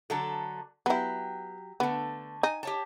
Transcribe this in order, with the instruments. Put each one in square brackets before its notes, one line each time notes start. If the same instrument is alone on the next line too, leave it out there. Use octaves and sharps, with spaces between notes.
[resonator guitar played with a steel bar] D3 F#3 A4
[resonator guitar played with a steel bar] F#3 G4 [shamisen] B3 E4
[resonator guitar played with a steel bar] D3 A3 [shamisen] B3
[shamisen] D#4 [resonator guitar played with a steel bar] G#5
[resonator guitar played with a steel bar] G4 C#5 A5